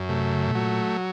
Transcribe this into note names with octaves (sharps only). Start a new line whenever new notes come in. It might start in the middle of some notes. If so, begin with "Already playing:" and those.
Already playing: F#2
C3 A3
C#3
B2
A#2 F#3